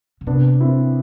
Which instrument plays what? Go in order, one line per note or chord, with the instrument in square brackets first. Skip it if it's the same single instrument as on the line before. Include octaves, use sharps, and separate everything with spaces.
[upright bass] D3
[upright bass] C3 [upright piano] B3 D4
[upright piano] C4 E4